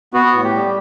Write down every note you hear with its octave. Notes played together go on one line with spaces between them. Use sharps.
B3 F#4
A2
G4
G3